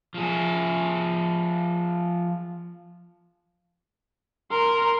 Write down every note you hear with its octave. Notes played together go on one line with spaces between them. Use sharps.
F3 G#4
A#4 C6